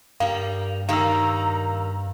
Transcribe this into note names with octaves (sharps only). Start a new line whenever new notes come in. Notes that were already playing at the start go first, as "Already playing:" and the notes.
G2 G3 A#3 F5
D#3 G3 A#3 F5 A#5 E6